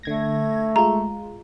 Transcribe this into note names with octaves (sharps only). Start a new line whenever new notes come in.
D3 A3 G#6 A#6
G#3 F4 A#5